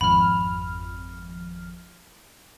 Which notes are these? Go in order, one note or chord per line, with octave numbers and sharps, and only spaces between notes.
G#1 F2 B5 F6